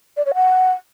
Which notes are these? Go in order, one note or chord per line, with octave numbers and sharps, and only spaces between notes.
D5
C#5
F#5